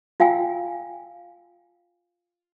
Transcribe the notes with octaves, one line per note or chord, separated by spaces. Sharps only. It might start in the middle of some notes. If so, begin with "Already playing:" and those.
F4 F5 G5 G#5